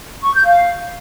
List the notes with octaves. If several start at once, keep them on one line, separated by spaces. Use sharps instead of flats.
C#6
G6
F5